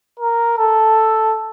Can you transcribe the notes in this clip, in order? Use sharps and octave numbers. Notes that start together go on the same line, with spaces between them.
A#4
A4